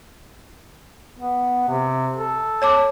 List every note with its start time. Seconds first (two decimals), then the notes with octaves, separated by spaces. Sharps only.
1.18 B3
1.69 C3
2.17 A4
2.62 C#5 A5 D6